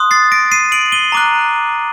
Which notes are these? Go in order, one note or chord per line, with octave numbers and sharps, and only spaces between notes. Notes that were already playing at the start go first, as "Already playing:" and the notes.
Already playing: C6 D#6 F#6
A6 C7
A#6 D7
C7 D#7
D7 F#7
D#7 G7
A#5 D6 F#6